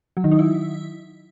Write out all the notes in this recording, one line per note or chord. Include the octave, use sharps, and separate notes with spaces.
F#3
D#3
D#4
E4